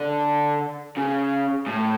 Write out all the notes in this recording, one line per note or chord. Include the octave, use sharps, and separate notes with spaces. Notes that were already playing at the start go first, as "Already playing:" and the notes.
Already playing: D3
C#3
A2